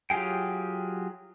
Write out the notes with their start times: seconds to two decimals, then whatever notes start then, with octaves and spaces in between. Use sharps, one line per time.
0.10 F#3 F4 G4 G#4 G5